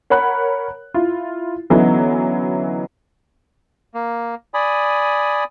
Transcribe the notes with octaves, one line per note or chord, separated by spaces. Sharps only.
A#4 C#5 F#5 B5 F#6
E4 F4
D3 E3 F#3 B3 C#4 D#4
A#3
D5 G#5 B5 D#6